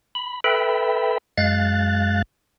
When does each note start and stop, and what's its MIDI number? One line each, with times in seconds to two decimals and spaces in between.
0.15 0.40 83
0.44 1.18 69
0.44 1.18 71
0.44 1.18 76
0.44 1.18 79
0.44 1.18 83
1.38 2.22 42
1.38 2.22 56
1.38 2.22 77
1.38 2.22 90
1.38 2.22 93